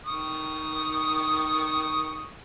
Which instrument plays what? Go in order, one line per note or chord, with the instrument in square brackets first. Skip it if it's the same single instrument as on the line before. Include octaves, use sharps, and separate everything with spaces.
[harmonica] D#3 C#6 D#6